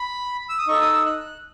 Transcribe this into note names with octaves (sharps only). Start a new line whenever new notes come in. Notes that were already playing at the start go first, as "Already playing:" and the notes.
Already playing: B5
E6
D#6
D#4 A4 C#6
D#6
E6
F#6
F#6